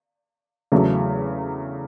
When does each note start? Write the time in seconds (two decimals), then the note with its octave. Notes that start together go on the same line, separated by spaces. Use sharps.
0.72 E2 C#3 F#3 A3